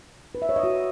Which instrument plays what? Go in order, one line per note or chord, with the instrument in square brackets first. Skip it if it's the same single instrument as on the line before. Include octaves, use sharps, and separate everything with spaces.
[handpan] B4
E5
C#5
D#5
F#4